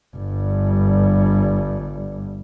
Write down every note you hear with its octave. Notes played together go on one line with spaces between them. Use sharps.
G1 G2